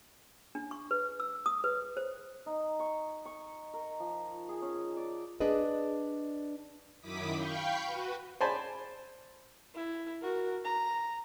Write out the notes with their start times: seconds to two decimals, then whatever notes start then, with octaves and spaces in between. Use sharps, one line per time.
0.55 D4
0.71 C#6
0.91 B4
1.20 E6
1.46 D#6
1.64 B4
1.97 C5
2.46 D#4
2.80 C#6
3.25 C#6
3.73 A#4
4.00 F3
4.49 G#4
4.62 C#4
4.97 D5
5.40 D4 G#4 B4 D5 D#5
7.01 F#2 D#3 E4 D6 D#6 B6
7.36 F5 G5 B5 C#6 G6
7.86 F#4 B4
8.41 C5 D5 G#5 A5 B5
9.75 E4
10.21 F#4 A#4
10.64 A#5